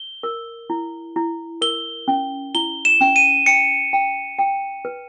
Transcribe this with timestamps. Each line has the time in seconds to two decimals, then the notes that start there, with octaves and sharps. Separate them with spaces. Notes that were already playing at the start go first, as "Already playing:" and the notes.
Already playing: G7
0.23 A#4
0.70 E4
1.16 E4
1.61 A#4 G7
2.08 C#4
2.55 E4 G7
2.85 E7
3.01 C#4
3.16 D#7
3.46 G5 C#7
3.93 G5
4.39 G5
4.85 B4